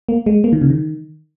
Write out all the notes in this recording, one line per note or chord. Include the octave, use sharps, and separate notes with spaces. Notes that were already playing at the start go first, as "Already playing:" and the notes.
A#3
G#3
A#3
D#3
C#3
D#3